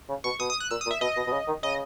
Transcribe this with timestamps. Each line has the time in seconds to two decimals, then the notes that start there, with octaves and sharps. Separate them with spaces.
0.09 C#3
0.24 B2 C#6
0.40 B2 D#6
0.50 D#6
0.60 F#6
0.71 A#2 E6
0.81 D#6
0.86 A#2
0.91 E5
1.01 B2 D#5
1.17 B2
1.27 B2
1.33 C#3
1.48 D#3
1.63 C#3 D#5